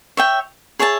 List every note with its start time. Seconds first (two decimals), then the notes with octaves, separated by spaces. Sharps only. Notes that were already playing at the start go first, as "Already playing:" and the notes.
0.17 C#5 E5 G5
0.79 G#4 C#5 E5 A5